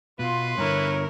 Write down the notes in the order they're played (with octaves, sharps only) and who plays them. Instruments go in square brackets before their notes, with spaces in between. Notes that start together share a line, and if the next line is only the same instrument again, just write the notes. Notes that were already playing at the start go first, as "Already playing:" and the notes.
[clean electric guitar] B2 [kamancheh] F4 C6 [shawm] B4
[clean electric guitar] G2 D3 [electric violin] E4 A#4 [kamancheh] C#5